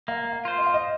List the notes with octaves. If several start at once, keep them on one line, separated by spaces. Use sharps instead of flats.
A#3 F5
F5
F4 C5
D#5
F5
D#5